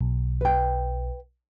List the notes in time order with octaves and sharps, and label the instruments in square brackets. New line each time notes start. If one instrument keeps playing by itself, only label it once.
[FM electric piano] B1
[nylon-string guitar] B4 G5